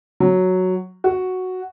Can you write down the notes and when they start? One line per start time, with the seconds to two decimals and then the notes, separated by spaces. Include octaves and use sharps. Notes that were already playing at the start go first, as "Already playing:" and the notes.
0.20 F#3
1.04 F#4